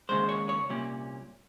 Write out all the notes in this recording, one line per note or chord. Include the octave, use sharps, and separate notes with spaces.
D#2 C#3 G#3 C5
C#5
C#5
C2 A#2 G3 C#4